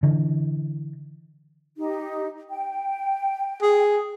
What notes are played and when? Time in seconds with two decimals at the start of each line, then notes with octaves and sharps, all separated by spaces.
0.03 D3 E3
1.77 D#4 G4
2.49 G5
3.62 G#4